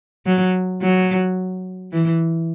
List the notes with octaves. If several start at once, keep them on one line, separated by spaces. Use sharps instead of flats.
F#3
F#3
E3